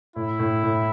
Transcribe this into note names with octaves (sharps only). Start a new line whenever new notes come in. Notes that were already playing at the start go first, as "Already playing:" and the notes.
A2 E4
A2
A2